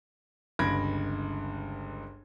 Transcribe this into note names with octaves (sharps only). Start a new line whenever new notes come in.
G1 C#2 B5 G#6 A#6 D7